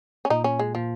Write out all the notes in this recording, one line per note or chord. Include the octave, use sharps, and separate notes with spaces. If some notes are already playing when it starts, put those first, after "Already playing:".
C#4
A#2 A#3 D#4 F4
C#4
G#3
A#2 F3 A#3 F4